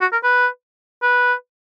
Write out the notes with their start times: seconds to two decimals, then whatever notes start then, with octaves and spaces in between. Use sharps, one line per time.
0.01 F#4
0.12 A#4
0.23 B4
1.03 B4